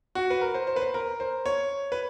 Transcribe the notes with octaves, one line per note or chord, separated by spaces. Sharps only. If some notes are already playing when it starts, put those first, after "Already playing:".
F#4
B4
A#4
C5
C5
B4
C5
A#4
C5
C#5
B4